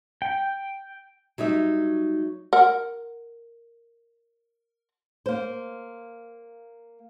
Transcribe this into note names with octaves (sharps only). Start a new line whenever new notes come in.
G5
F#3 G3 D#4 E5
A#4 F#5
A#3 C5